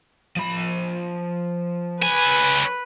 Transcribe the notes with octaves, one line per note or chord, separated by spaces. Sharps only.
F3 B5
C#2 B4 G#5